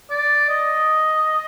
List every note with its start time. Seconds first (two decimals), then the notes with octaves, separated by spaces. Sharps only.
0.10 D5
0.49 D#5